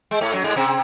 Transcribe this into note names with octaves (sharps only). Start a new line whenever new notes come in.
G#3
A2 A3
F#2 F#3
G#2 G#3
C3 C4